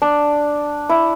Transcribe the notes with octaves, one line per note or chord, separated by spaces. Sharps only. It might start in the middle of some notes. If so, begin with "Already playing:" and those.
D4
E4